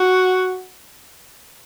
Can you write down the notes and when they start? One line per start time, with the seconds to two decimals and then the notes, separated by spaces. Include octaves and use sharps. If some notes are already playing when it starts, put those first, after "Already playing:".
Already playing: F#4